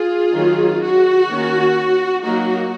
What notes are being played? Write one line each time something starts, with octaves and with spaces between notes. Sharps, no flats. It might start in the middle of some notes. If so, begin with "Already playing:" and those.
Already playing: F4 G#4
D#3 F#3 A#3 C#4
F#4
D#3 A#3 C#4
F#3 A#3 D#4 F#4